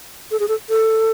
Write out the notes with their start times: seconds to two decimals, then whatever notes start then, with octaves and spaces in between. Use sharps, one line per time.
0.31 A4
0.40 G#4
0.48 A4
0.69 A4